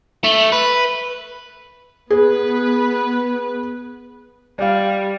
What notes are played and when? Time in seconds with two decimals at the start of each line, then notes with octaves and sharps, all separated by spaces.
0.24 A3
0.52 B4
2.10 B3 G#4 B4
4.59 G3 D5 F5